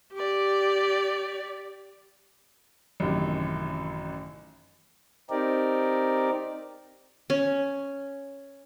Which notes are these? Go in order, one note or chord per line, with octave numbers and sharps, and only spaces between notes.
G4 D5
A1 F#2 C3 D#3
C4 D#4 G4 A#4 D5
C#4